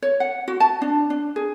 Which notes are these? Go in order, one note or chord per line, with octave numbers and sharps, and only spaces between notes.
C#5
F#5
F#4
A5
D4
D4
G#4